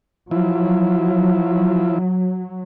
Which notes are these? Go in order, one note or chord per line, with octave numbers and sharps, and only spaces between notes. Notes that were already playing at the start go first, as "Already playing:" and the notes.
F3 F#3 E4